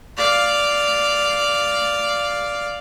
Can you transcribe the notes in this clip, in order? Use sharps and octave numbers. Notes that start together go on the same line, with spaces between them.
D5 F5